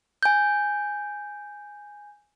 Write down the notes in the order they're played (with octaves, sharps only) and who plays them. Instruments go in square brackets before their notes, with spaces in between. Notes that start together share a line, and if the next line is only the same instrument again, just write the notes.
[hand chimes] G#5 G6